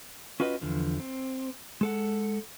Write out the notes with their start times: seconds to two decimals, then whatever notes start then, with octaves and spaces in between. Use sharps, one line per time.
0.40 C#4 F4 F#4 B4 D#5
0.61 E2 D3 F3
1.00 C4
1.81 G#3 A4 F#5